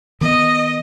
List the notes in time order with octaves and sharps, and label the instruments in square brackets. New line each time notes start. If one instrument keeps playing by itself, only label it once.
[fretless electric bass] D#3 B3 [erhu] D#5